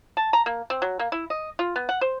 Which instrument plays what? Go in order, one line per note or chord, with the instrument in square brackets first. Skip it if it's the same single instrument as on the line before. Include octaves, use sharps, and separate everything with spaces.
[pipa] A5
A#5
A#3
C4
F#3
A#3
E4
D#5
F4
B3
F#5
C5